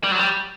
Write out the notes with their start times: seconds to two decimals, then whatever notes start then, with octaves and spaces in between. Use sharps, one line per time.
0.03 G3
0.11 F#3
0.19 G3